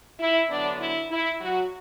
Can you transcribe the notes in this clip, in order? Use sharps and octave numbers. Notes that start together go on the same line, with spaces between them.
E4
D3 F#3 B3 D4
E4
E4
F#3 F#4